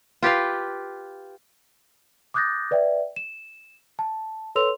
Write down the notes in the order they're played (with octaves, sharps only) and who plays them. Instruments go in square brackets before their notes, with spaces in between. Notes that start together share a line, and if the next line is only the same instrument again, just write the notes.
[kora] F4 G4 B4 F5
[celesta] D6 D#6 F#6 G6 A6 A#6
B4 D5 E5 G5
E7
A5
A4 B4 C#5 C6 E6 F7